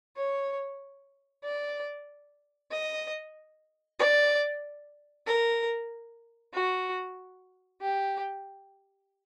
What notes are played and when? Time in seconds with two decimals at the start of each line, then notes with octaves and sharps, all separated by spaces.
0.17 C#5
1.44 D5
2.71 D#5
3.99 D5
5.27 A#4
6.54 F#4
7.81 G4